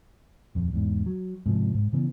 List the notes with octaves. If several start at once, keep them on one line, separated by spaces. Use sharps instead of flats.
D#1 F2
E2 G#2
F#3
G#2 C3 F3
G#2
C#3 E3 B3